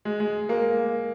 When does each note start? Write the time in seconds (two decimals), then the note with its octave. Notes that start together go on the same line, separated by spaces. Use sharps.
0.05 G#3
0.20 G#3
0.49 A#3